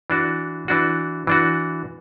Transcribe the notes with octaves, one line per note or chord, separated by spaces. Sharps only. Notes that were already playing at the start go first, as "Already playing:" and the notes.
E3 D4 F#4
E3 D4 F#4
E3 D4 F#4